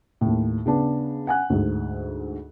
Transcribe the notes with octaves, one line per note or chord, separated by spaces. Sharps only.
D#2 A2
C#3 B3 D4
F#5 G#5 F#6
D2 G#2